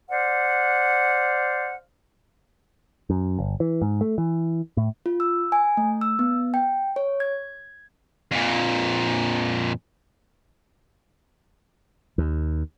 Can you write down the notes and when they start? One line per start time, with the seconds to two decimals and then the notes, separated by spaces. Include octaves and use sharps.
0.11 C5 D5 F5 F#5
3.10 F#2
3.39 G1
3.60 E3
3.82 G#2
4.01 A3
4.18 E3
4.77 A2
5.06 F4
5.20 E6
5.52 G#5
5.77 A3
6.01 E6
6.19 B3
6.54 G5
6.96 C#5
7.20 G#6
8.31 F2 A#2
12.18 D#2